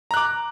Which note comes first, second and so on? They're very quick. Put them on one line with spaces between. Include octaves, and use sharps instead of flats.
A#5 F#6 D6